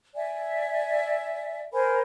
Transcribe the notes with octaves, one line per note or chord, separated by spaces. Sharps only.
D5 E5 G#5
A#4 C5 G#5 B5